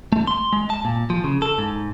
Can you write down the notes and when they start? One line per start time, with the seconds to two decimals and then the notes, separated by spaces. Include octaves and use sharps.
0.13 A3
0.27 C6
0.53 G#3
0.70 A5
0.85 A#2
1.10 F3
1.24 C#3
1.42 A4
1.58 G#2